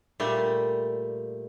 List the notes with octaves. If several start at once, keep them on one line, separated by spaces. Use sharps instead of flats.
A#2 G3 A3